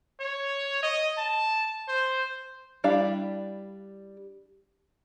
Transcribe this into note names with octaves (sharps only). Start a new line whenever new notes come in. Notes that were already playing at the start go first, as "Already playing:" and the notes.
C#5
D#5
A5
C5
G3 D4 E4 G4 F5